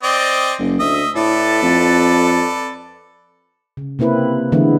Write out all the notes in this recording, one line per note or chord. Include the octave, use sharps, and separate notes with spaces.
C4 D5 D#5
F#1
D2 D#5 E5
A2 A4 B4 D5
F2
C#3
C3 A#3 C4 E4 B4
D3 E3 G#3 B3 E4